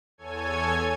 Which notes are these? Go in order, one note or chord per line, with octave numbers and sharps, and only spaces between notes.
E2 A4 C#5 G#5 G#6